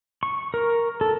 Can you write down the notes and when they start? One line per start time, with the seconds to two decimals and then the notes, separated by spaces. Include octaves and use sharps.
0.23 C#6
0.54 A#4
1.01 A4